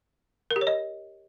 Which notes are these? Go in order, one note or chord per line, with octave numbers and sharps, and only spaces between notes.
A#4
G4
C#5
D#5